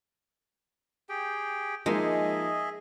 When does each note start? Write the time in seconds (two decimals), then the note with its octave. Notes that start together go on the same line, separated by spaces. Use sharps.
1.09 G4 G#4 G5
1.86 F3 G#3 A#3 D#4 G#4 D#5 E5